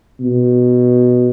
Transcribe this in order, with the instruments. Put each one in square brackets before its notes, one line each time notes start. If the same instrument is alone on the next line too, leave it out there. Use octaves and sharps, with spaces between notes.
[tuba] B2